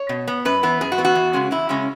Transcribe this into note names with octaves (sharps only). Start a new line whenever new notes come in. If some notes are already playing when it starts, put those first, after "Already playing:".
Already playing: C#5
B2
B3
F#2 B4
E3 B3
F#2 G#4
F#4
E3 B3
F#4
E2
C#3 G#3 C#4
E2 E4
C#3 G#3 C#4